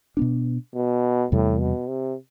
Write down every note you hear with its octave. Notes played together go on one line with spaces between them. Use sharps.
B2 B3 D4
B2
E2 A2 C3 G3
B2
C3